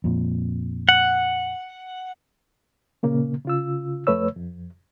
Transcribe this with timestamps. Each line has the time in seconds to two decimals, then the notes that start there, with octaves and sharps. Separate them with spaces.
0.04 F2 A#2
0.89 F#5
3.03 A#2 C#3 A#3
3.45 C#3 F4 E6
4.07 F2 A3 B4 C#5 E6
4.36 F2